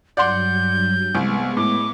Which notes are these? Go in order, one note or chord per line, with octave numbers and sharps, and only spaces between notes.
G2 F#3 D5 F#5 C6 G6
C2 G#3 B3 C#6
A2 D6